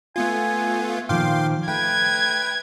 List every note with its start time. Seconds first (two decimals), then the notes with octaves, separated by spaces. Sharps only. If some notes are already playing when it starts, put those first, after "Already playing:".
0.16 A3 B3 F4 G#5
1.09 A#2 D#3 F3 F5 G5 C6 D6
1.68 A3 B4 G5 G#6